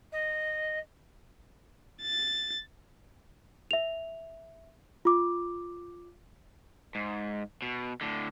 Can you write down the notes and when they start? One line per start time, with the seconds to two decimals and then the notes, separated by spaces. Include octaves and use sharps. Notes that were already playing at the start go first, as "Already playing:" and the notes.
0.12 D#5
2.02 A6
3.71 E5 F7
5.05 F4 D6
6.95 G#2
7.62 B2
8.01 A2 D3